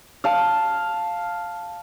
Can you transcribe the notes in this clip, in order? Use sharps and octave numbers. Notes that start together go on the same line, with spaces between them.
F5 A5